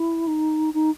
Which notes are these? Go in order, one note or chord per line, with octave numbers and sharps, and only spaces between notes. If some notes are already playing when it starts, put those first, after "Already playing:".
Already playing: E4
D#4
D#4